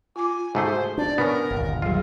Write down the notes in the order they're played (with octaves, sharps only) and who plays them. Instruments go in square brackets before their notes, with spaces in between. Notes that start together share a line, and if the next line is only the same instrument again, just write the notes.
[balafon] F4 D6 [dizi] G#5
[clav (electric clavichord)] G#2 A3 G#4 [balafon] F#4 [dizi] C5
[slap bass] D4 [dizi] D5
[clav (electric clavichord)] B3 C#4 [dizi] A#4
[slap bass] G1 D#2 A#2
[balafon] F#3 G3 G#4 [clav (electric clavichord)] F4